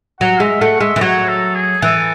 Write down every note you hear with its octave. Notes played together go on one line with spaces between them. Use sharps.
F#3 F#5
G#3 E5
A3 F#5
G#3 E5
E3
F#3 C#5
A4
G#4
E3 A4